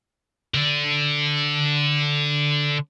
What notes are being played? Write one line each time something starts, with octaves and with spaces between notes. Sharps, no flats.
D3 D4